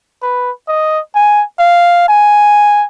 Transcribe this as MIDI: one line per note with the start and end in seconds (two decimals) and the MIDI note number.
0.22 0.51 71
0.68 0.99 75
1.15 1.43 80
1.59 2.04 77
2.09 2.86 80